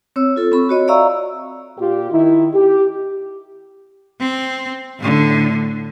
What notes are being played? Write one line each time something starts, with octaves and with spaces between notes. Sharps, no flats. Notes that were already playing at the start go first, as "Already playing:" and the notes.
C4 C#5 E6
F4 A4
C4 B5 C#6
F#4 C#5 D#5
D5 E5 F5 A#5 C#6 E6
A#2 F4 G4
D#3 E4
G4
C4
A2 D3